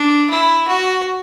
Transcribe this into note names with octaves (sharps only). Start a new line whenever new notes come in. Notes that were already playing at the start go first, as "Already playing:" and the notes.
Already playing: D4
E4
F#4